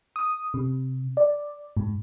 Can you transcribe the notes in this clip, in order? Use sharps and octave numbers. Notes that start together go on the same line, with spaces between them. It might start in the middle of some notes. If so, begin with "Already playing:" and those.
D#6
C3
D5
G#2